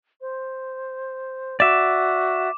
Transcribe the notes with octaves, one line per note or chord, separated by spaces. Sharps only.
C5
F#4 D5 E5 D6 E7